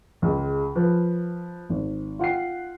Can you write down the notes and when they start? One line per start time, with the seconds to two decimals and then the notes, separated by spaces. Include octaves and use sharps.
0.22 C#2 G#3
0.75 F3 B4
1.69 G#1
2.19 F4 F#5 G5 C7